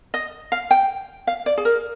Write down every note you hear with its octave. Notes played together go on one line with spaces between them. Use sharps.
D#5
F5
G5
F5
D5
G#4
A#4